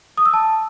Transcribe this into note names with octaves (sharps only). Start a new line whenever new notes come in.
D#6
E6
A5